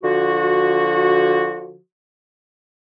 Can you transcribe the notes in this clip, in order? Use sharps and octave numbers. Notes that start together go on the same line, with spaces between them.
D3 F3 F#4